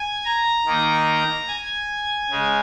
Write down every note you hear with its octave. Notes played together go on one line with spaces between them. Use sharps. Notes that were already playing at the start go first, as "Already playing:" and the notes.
Already playing: G#5
A#5
D#3 A#3 D#4
G#5
C#3 G#3